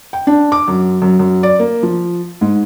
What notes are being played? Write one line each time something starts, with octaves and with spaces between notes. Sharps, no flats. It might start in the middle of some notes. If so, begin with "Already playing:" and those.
G5
D4
D6
F#2
F#2
F#2
D5
A#3
F3
G#2